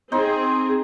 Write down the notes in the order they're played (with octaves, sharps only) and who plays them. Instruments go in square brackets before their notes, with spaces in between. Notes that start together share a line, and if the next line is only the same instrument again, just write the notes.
[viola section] C4 G#4 [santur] D#4 C5